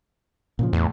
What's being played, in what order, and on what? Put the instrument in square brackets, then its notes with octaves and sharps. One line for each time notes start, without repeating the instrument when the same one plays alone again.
[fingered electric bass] A#2 C#3 F3
[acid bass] E2 [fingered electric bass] A2